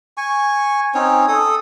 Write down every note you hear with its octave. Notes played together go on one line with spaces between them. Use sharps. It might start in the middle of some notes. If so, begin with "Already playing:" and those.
G#5 C#6
C4 C#4 D#4 C#5
A4 D#6